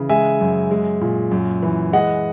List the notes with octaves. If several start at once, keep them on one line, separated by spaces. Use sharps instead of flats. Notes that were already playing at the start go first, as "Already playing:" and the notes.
Already playing: C#3 E3
G#3 E5 G#5
F#2
G#3
A#2
F#2
E3
G#3 D#5 F#5